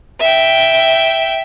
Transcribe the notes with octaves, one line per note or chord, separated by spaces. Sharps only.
E5 G5